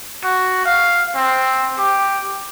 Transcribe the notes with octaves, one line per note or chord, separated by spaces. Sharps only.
F#4
F5
C4
G4